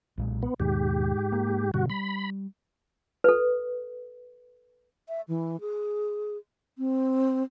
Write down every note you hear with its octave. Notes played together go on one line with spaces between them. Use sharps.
B1 A#2 G#3
B3
D#2 G#2 B2 D#3 G4
A#3
G2 B2 D3 F#4
G3 B5
A4 B4
E5
E3
G#4
C4